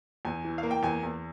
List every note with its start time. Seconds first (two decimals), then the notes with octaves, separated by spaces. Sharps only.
0.25 E2 G#5
0.45 E3
0.58 F5
0.63 A#3
0.71 G5
0.83 E2 G#5
1.03 E2